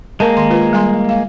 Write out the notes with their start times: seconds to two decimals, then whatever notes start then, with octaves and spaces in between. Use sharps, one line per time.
0.20 G#3 A#3 A#4 A5
0.36 D#3 C6
0.50 F4 G#4 B4
0.73 G3 G#5 C6
1.09 F5